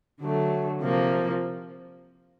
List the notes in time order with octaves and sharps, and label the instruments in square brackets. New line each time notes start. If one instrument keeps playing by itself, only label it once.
[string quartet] D3 F#3 A3
C3 F3 A#3